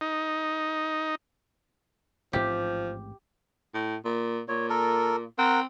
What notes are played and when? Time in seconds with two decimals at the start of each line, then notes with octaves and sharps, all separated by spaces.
0.01 D#4
2.33 A1 G#2 F3 C4 G4
3.74 A2
4.05 A#2
4.48 A#2 C#5
4.70 A4 A#4
5.38 C4 A#4 F#5